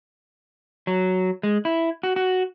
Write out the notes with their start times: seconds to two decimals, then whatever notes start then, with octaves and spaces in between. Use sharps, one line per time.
0.87 F#3
1.43 G#3
1.65 E4
2.03 F#4
2.16 F#4